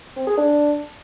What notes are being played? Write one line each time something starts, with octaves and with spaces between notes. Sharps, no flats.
C4
G#4
D4